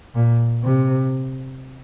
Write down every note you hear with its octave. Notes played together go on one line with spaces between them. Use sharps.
A#2
C3